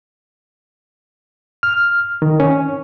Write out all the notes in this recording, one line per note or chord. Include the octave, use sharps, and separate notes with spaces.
F6
D#3
C#4